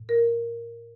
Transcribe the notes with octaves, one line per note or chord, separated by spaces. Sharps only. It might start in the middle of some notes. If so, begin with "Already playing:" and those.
Already playing: A2
A#4